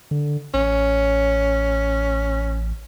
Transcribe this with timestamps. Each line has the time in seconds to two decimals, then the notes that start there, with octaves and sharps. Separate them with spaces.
0.11 D3
0.54 A1 C#4